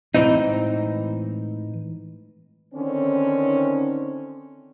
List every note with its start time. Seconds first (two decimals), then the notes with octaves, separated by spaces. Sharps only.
0.14 A2 E3 G#3 C4 D#4
2.74 D3 D#3 C4 C#4